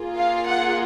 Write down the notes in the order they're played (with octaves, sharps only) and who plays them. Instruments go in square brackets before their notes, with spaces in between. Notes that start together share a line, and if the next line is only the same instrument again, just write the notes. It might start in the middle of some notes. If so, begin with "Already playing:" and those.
Already playing: [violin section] A#3 F4 G#4
F5
F#5